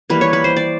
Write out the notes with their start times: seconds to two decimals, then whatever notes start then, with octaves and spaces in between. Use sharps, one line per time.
0.10 E3 G3 A#3 B4
0.21 C#5
0.33 B4
0.44 C5
0.56 D5